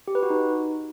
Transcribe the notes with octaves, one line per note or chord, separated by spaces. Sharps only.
G4
B4
F#4
D#4